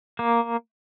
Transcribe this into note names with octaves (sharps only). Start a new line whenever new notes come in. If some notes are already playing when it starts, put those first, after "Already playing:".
A#3